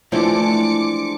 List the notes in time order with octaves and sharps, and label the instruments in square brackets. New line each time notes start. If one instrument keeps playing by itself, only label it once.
[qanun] E3 F3 [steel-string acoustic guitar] G#3 C4 D4 [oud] A3 [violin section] D6 C#7